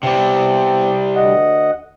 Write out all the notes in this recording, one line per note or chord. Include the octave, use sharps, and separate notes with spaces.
C3 G3 B3 C4
D2 D#5 F#5